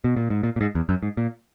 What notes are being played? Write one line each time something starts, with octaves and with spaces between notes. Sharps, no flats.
B2
A#2
G#2
A#2
A#2
G#2
E2
F#2
G#2
A#2